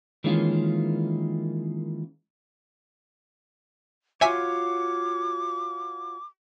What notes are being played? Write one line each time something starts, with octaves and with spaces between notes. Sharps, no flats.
D#3 E3 G#3 A#3 C#4 F4
F4 F#4 C#5 E5 G#5 D6 B6